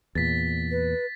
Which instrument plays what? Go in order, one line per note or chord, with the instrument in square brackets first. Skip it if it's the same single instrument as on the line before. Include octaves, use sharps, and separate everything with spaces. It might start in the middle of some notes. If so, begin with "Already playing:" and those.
[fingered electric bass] E2 A#2 [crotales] A6 B6
[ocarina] B4